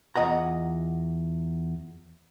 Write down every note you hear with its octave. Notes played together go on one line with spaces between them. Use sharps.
E2 F4 D#5 F#5 A#5